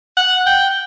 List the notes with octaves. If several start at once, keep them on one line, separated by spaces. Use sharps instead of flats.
F#5
G5